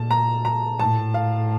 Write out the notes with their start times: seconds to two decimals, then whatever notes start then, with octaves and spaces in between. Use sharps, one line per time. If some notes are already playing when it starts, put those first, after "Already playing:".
Already playing: A#2 A5
0.11 A#5
0.45 A#5
0.80 A2 A5
1.14 F5